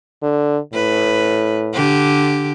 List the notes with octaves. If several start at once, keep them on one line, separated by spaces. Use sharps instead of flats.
D3
A2 B4
D3 G4